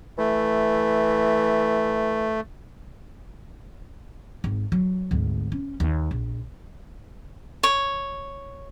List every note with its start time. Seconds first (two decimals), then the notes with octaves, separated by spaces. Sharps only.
0.18 E3 A3
4.44 G#1
4.72 F#3
5.11 G#1 D2
5.52 C#4
5.80 D#2
6.11 A#1
7.63 C#5